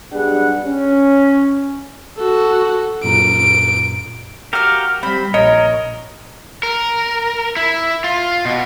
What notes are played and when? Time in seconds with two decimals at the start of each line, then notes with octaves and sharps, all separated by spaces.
0.12 B1 G3 B3 D4 G#4 F#5
0.66 C#4
2.17 F#4 A4
3.04 F#2 A#2 A#5 D7
4.53 F#4 G4 A#4 F5 F6
5.03 G3 C4 B5
5.34 A#1 A#4 C#5 D#5
6.63 A#4
7.56 E4
8.04 F4
8.45 B2